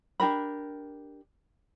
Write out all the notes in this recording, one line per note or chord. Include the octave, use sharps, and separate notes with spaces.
D4 G4 A#4 B5